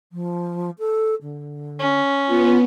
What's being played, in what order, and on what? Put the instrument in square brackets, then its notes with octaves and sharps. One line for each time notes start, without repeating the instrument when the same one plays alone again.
[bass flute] F3
A4
D3
[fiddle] C#4
[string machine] B3 [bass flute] F4